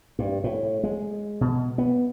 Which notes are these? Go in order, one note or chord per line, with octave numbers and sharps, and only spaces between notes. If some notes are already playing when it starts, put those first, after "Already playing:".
G2
A2
G#3
B2
B3